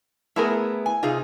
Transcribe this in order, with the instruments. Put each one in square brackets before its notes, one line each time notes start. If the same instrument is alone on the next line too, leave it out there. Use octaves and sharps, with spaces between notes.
[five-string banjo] A3 B3 A#4 [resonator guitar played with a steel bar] E4 G#4
[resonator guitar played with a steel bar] G#5
[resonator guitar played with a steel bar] C3 D#4 G#4 [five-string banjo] F4